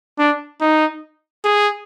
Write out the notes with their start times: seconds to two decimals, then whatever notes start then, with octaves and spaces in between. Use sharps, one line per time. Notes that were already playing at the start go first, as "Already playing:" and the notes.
0.19 D4
0.61 D#4
1.45 G#4